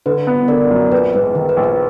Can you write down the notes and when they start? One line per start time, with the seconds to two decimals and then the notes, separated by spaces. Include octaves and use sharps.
0.06 D3 B4
0.27 B3
0.48 D3 A#4 D5
0.70 F#2
0.92 A#1 B4
1.13 G#2 B4
1.35 D#3 B4
1.49 B4
1.57 A#1
1.63 B4